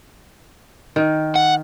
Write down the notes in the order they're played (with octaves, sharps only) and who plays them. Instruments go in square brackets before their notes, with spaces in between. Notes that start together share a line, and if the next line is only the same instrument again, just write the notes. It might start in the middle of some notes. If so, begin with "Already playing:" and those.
[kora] D#3
[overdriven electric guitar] F#5